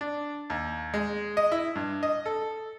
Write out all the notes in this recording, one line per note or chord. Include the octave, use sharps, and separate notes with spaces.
D4
D#2
G#3
D#5
E4
G2
D#5
A4